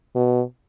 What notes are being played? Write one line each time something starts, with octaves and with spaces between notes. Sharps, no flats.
B2